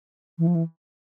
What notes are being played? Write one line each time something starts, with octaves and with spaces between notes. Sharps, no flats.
E3
F3
E3